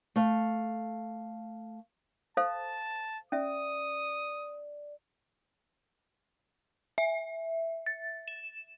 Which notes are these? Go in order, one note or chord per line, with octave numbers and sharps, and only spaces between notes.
A3 F5
A4 C5 F5 A5
C#4 D5 E5 D#6
E5
A6
E7